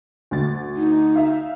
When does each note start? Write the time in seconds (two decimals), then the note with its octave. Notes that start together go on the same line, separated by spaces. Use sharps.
0.31 D2 A6
0.77 D#4
1.16 E5 F5